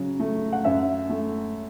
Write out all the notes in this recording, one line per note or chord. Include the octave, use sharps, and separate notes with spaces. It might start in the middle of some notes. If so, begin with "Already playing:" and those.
Already playing: C#3 F#3
A3
F#5
F#2 E5
A3